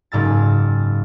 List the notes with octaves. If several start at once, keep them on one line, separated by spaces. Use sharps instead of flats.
F#1 G#2 E6 A6